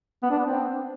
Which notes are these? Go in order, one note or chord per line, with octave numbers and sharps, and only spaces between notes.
B3
D4
B3
C4